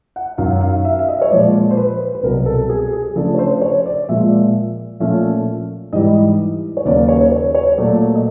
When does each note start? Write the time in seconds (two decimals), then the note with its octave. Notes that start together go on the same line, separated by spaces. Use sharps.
0.16 F#5
0.38 F#2 D#3 F#3 F5
0.61 F5
0.85 E5
0.92 F5
0.99 E5
1.08 D#5
1.22 C#5
1.31 A#2 F3 G#3 D5
1.71 C5
1.77 B4
2.15 B4
2.23 C2 B2 F#3 A#4
2.46 A4
2.69 G#4
2.93 G#4
3.16 C#3 F3 A3 D4 A4
3.34 C#5
3.39 C5
3.61 C#5
3.86 D5
4.09 A#2 F3 G#3 E5
5.00 A#2 F3 A3 C#4 E5
5.93 G#2 E3 G3 D#5
6.77 C#5
6.85 D#2 C#3 F#3 A#3 D5
7.08 C#5
7.32 C#5
7.55 C#5
7.78 A#2 F#3 A3 D5
8.15 D#5